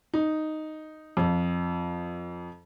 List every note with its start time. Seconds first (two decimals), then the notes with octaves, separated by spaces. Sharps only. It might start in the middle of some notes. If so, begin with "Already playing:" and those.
0.14 D#4
1.17 F2